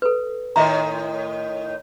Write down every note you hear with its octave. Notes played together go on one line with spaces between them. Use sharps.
A4 B4
A2 D#3 D#5 E5 A#5